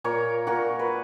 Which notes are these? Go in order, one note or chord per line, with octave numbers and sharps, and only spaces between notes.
A#2 A#4 C#5
A#2 F#4 A#4
B4